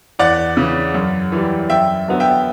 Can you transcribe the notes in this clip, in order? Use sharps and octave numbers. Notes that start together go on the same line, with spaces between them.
E2 D5 F#5
C#3 E3
F#2
E3 G3
F#2 E5 G5
D3 F#3 B3
E5 G5